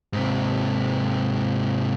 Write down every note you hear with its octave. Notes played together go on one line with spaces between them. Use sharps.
G#2 C3